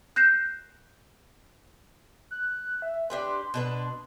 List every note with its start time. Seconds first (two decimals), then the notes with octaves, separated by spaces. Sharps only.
0.16 F#6 G6 A#6 C7 E7
2.31 F#6
2.82 E5
3.10 D4 G4 B4 C6
3.54 B2 D4 B4